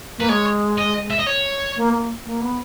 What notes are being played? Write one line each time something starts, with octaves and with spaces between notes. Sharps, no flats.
A#3 B4
G#3 C#5
D#5
E5
D#5
C#5
A#3
A#3
A#3
B3